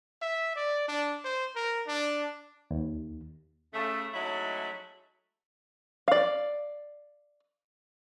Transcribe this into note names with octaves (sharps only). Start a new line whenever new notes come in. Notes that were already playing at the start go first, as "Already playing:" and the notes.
E5
D5
D4
C5
A#4
D4
D#2
C#3 A3
F#3 G#3 A3 C#4 D#4 E4
D5 F5